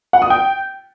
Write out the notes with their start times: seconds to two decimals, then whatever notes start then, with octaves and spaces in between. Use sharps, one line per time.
0.13 F#5
0.22 D#6
0.30 G5